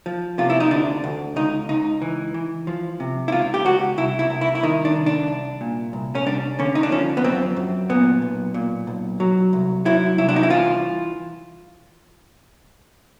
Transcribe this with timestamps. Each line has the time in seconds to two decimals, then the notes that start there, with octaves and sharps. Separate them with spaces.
0.06 F3
0.38 C3 F4
0.50 E4
0.60 D#4
0.71 D2 D4
1.04 D2
1.36 C#2 D#4
1.69 C#2 D#4
2.02 E3
2.34 E3
2.67 F3
3.00 C3
3.28 E4
3.32 C#2 F4
3.54 G4
3.65 C#2 F#4
3.98 C2 E4
4.19 E4
4.30 C2
4.41 E4
4.55 E4
4.63 D#3 D#4
4.85 D4
4.95 C2
5.06 D4
5.28 C2
5.61 A#2
5.93 C2
6.15 C#4
6.26 C2 D4
6.59 D3 C#4
6.75 D#4
6.83 D4
6.92 F3 C#4
7.17 B3
7.24 F#2 C4
7.56 F#2
7.89 A#2 B3
8.22 B1
8.54 A#2
8.87 B1
9.20 F#3
9.53 C2
9.85 F#3 E4
10.18 C2 E4
10.29 D4
10.36 D#4
10.43 E4
10.50 E3 F4